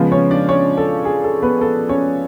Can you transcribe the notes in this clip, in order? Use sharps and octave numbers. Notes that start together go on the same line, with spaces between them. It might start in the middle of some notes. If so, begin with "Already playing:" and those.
Already playing: C#3 F3 G#3 B3
C#4 C#5
D4 D5
C#4 C#5
A4
G#4
A4
B3 B4
A4
C#4 C#5